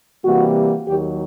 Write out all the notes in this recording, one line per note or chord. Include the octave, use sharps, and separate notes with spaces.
C3 E3 G3 A#3 F#4
D#2 D#3 F#3 G4